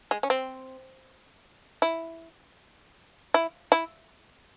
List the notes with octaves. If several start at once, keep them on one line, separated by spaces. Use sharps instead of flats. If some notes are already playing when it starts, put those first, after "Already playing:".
G#3
C#4
C4
E4
E4
E4